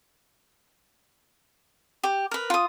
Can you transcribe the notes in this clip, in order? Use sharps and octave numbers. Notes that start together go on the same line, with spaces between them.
G4
A#4 B4
F4 D#6